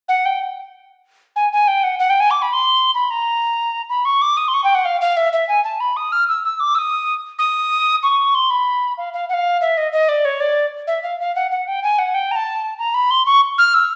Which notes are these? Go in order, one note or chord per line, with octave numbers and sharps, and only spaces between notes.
F#5
G5
G#5
G#5
G5
F#5
F#5
G5
G#5
D6
B5
C6
B5
A#5
B5
C#6
D6
D#6
C6
C#6
G5
F#5
F5
F5
E5
E5
G#5
A5
B5
D#6
F6
E6
E6
D6
E6
D#6
D#6
C#6
C6
B5
F5
F5
F#5
F5
E5
D#5
D#5
D5
C#5
D5
E5
F5
F5
F#5
F#5
G5
G#5
F#5
G5
A#5
A5
A#5
B5
C6
C#6
F6
E6